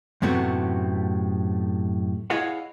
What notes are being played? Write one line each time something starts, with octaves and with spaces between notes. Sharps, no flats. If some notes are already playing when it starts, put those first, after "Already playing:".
F#2 A2 C3 A3 B3 F#4
E4 G#4 C#5 D#5 F5 F#5